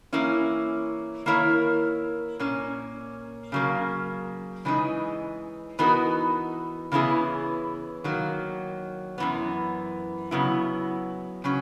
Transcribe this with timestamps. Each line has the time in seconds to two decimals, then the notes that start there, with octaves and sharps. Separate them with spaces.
0.13 E3 A#3 C#4 E4
1.26 D#3 A#3 E4 A#4 C#5
2.39 A#2 A#3 C#4
3.52 C#3 F#3 A#3
4.65 C#3 E3 G#3 D#4
5.79 E3 B3 D#4 F#4 A#4
6.92 C#3 E3 B3 E4 G#4
8.04 D#3 F#3 A#3
9.18 F#2 E3 B3
10.31 C#3 F#3 B3 E4
11.44 C#3 F#3 C#4